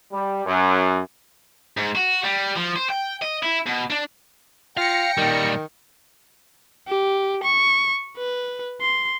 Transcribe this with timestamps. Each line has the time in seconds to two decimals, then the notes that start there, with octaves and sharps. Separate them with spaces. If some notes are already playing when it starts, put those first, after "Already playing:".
0.12 G3
0.46 F#2
1.77 G#2
1.95 F#4
2.23 G3
2.56 F3
2.76 C5
2.89 G5
3.22 D#5
3.43 E4
3.66 B2
3.90 D4
4.77 F4 F5 G5 A#6 C#7
5.18 A#2 D#3 G3
6.88 G4
7.43 C#6
8.17 B4
8.81 C6